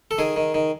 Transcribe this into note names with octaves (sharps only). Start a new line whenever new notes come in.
A4
D#3 G#4
D#3
D#3